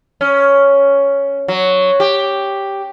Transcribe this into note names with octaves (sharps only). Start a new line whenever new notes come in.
C#4
F#3
G4